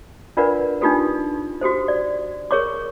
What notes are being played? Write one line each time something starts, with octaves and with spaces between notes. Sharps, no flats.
D4 F4 A#4 B4 D5 F#5
D4 D#4 F4 G4 A4 B4
F#4 G4 A4 C5
D5
G#4 A#4 C#5 C#6 D6